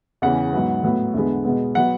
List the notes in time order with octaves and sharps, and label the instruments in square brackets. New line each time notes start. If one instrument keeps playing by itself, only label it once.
[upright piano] E2 C#3 E3 F#5
G#2 F#3 B3
A2 F#3 B3
E2 D3 G#3 B3
B2 G#3 B3
F#3 B3 F#5